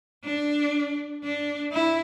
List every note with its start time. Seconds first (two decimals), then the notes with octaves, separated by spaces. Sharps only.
0.24 D4
1.23 D4
1.72 E4